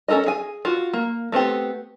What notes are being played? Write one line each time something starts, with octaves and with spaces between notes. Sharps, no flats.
C#4 D#4 A4 A#4 D#5
G#4 G#5
F4 F#4
A#3
A3 B3 C4 G4